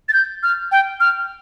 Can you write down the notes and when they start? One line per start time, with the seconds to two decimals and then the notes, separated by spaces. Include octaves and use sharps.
0.09 A6
0.13 G6
0.43 F6
0.72 G5
1.00 F6